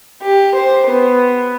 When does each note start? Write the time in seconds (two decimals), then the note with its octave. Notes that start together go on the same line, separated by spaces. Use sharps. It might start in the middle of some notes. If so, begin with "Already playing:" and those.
0.23 G4
0.56 C5
0.89 B3